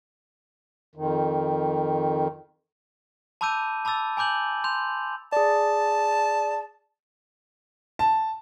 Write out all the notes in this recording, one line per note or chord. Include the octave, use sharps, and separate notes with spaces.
F2 D#3
A5 B5 D6 E6 G6 D#7
A5 B5 D6 E6 A6
G#5 B5 D6 G6 F#7
C6 G6 F7
G#4 D5 A5
A5